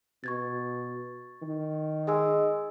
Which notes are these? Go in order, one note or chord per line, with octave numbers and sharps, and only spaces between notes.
B2 C#6 G#6 A6
D#3
G#3 D#5 G#5 E6